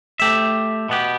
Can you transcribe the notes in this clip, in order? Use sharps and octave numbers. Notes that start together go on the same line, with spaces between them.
A3 G4 E5
B2 B3 G4